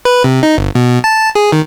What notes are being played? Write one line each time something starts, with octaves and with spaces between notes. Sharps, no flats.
B4
C3
D#4
G1
B2
A5
G#4
D#3